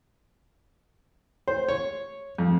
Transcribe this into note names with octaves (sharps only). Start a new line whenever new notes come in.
C5
C#5
F2